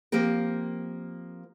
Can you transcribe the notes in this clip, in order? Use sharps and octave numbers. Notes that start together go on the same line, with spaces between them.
F3 A#3 C4 G4 A#4